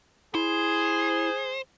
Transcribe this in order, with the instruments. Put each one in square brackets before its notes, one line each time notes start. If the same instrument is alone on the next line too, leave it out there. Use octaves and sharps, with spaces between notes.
[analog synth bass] E4 [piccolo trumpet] G#4 [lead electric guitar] C5